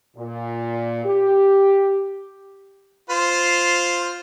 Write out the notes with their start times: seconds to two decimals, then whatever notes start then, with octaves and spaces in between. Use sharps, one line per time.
0.17 A#2
1.05 G4
3.10 F4 C5